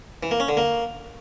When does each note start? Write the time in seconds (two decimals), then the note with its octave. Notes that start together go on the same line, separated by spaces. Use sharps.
0.23 E3
0.31 A#3
0.40 C#4
0.49 D3
0.57 A#3